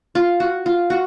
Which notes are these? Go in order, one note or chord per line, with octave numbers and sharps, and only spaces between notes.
F4
F#4
F4
F#4